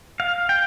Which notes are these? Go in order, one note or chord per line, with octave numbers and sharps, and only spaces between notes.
F5
G5